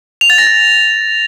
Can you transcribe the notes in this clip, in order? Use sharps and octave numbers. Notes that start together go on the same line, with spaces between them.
F7
A6
A#6
A6